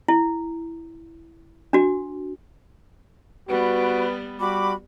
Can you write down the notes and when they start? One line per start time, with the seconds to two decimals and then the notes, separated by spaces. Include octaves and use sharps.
0.08 E4
1.73 D4 F#4
3.49 G3 B3 F#4 B4
4.39 G3 F#4 B5 D6